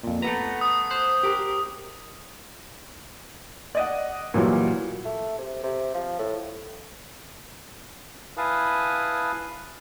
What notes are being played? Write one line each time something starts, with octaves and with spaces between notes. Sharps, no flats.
F2 A#2
A3 B3 B4 A#5
D#6
C5 F#6
G4 A#4
D5 D#5 F#5
A#2 E3 F#3 G3
A3
C3
C3
F3
A2
E4 B4 F5 G#5 A5 D#6